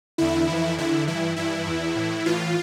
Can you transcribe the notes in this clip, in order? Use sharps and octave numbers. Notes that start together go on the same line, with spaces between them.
E2 D3 E4
F2 E3
E2 D3 E4
G2 E3 E4
G2 E3 E4
E2 E3
A2 E3
A2 E3 F4